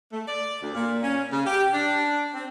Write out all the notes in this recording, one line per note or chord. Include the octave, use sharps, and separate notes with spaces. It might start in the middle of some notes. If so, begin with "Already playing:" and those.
A3
D5
D2
A#2
C#4
C#3
G4
D4
C4